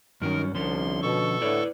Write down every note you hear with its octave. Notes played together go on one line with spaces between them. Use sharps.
G2 D#3 F#3 C#4 A#4
C2 D3 F3 C#4 C6
B2 A4 C#6
A2 D3 E4 B4 D5